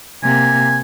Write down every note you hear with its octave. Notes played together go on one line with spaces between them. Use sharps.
C3 A#3 G#5